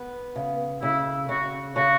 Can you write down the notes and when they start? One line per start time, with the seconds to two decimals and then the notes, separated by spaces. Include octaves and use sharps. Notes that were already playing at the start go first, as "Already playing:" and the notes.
Already playing: B3
0.36 C#3
0.83 C#3 E4
1.29 C#3 F#4
1.76 C#3 F#4